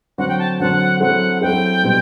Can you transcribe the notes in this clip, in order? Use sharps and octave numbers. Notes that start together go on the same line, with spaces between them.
D3 F#3 C4 F#4 C5 F#5
G5
A5
D3 F#3 C4 F#4 C5 F#5
F#3 C4 E4 A4 F#5
F#3 C4 E4 A4 G5
B2 G3 C4